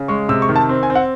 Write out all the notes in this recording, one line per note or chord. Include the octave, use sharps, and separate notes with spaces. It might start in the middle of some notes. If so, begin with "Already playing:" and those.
Already playing: C#3
G#3 C#6
C3 E6
C#6
D#3
A5
C4
G#5
C4
F#5